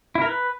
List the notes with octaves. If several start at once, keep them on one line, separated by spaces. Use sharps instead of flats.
E4
A#4
B4